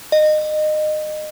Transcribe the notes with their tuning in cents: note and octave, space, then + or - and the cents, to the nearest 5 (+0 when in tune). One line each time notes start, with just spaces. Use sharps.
D#5 -25